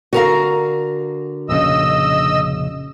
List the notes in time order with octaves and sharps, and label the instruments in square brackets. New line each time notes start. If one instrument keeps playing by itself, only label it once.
[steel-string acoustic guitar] D3 A#4 A#5 [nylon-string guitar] F#4 F5
[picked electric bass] F1 A#1 C#3 [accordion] D#5 E6